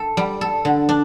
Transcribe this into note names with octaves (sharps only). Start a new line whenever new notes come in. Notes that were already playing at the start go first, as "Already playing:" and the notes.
Already playing: A4
G3
A4
D3
D4